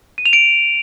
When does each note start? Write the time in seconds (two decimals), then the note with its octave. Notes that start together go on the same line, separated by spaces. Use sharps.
0.18 D#7
0.26 F7
0.33 D7